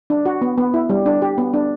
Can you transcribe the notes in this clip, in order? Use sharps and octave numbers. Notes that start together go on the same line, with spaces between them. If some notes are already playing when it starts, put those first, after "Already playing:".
D4
F#4
B3
B3
E4
G3
D4
G4
B3
D4